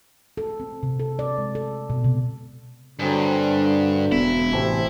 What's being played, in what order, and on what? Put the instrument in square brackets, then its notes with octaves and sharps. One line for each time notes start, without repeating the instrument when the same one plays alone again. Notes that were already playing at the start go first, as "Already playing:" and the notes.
[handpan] A4
C4
C3
A4
D5
G#3
A4
B2
C3
[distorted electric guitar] G2 [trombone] D3 [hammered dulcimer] F#3 C4 G#4
[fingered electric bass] E1 B3 [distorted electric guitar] E4
[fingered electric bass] A1 [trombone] C3 [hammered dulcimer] E3 A3 C4